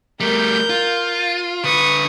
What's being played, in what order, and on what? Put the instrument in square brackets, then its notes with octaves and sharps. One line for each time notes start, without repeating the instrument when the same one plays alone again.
[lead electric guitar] G3 A3 [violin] A#4 G6
[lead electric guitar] F4
[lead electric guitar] D3 B4 [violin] C#6 D#6